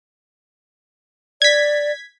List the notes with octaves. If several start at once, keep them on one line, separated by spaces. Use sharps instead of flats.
D5 G#6 B6